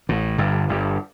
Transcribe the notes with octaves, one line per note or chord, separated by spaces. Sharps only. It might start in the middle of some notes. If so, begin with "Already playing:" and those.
A1 A2
G1 G2
G1 G2